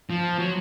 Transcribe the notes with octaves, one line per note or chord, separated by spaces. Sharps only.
F3
F#3